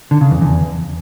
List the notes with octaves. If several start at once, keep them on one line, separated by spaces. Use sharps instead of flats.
D3
C#3
E2
E2